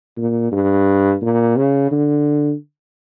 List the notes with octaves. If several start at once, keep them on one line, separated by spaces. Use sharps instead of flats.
A#2
G2
A#2
C#3
D3